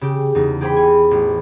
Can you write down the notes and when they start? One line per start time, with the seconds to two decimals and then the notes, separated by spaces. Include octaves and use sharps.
0.01 C#3 G4
0.35 E2 C#3 D#4
0.61 G4 G#4 C5 G5 B5
0.77 G#5
1.11 A1